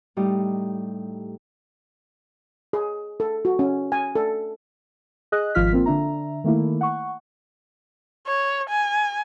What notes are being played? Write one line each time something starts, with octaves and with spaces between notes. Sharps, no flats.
A2 G3 D#4 G4 D#6
G#4
A4
F#4
C#4
G#5
A4
G#4 D#5 F#6
G#1 F3 F4 F6 B6
A#3 C4 F4
D3 D4 E5 A#5
D#3 A3 A#3 E4
F#5 C#6
C#5
G#5